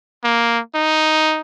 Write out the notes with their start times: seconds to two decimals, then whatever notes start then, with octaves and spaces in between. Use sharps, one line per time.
0.24 A#3
0.75 D#4